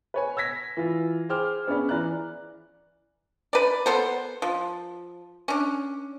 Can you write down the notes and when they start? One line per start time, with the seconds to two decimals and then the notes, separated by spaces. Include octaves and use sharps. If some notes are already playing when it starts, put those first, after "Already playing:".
0.14 B4 C#5 G#5
0.37 E6 G#6 A#6 B6
0.77 E3 F4
1.29 G#4 C5 G5 D6 F6
1.68 B3 C#4 G#4 D5 B5
1.89 E3 D5 A#5 F#6
3.53 B4 D5
3.86 B3 A4 C5
4.42 F3
5.48 C#4 D4